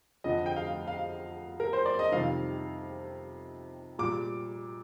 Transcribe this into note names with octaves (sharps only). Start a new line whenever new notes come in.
F2 D3 F3 D#5
G5
F5
F5
A#4
C5
D5
D#5
F2 C3 D#3 G3 F5
A#2 G3 D6